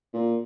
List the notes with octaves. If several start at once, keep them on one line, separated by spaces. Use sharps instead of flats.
A#2